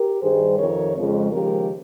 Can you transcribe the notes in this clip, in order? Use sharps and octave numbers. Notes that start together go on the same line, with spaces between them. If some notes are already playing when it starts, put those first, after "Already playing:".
Already playing: G4 A#4
G2 D#3 G3 G#4 C5
F2 C3 D#3 A#4 C#5
F2 C#3 F3 G#3
D#2 C#3 F3 G#3 G4 A#4